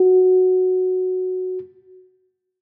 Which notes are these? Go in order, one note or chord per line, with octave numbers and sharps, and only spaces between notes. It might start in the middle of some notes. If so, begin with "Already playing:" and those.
Already playing: F#4